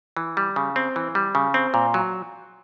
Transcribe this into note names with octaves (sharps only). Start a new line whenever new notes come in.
E3
G3
C#3
C4
E3
G3
C#3
C4
A#2
F#3